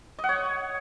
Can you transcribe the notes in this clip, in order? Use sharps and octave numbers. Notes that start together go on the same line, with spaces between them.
D#5
F#5
C#5